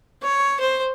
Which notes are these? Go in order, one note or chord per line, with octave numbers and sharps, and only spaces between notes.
C#5
C5